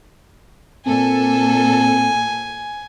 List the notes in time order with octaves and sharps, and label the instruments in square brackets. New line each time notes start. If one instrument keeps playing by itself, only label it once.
[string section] A#2 A4 [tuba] C4 [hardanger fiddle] G#5